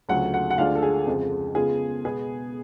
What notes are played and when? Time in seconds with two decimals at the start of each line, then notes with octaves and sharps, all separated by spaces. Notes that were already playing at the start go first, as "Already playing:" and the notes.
0.09 D2 C#3 F#3 A3 F4 F#5
0.34 F#5
0.51 F#5
0.58 D2 D3 G#3 D4 F4 F5
0.75 A4
0.83 G#4
1.07 F2 C#3 F3 G#3
1.55 C#3 G#3 B3 F4 G#4
2.04 B2 G#3 B3 G#4